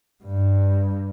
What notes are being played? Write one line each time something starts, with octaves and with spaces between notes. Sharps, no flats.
G2